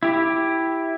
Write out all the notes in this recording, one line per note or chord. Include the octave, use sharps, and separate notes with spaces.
E4 G4